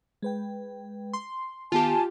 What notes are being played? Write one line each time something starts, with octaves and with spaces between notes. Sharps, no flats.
G#3 B4 G5
C6
D#3 B3 F4 G4 G#5 A5